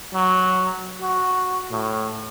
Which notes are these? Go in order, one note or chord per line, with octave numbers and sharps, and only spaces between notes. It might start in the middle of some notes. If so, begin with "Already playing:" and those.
F#3
F#4
A2